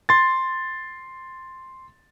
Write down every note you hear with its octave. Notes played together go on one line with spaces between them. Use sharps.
C6 A6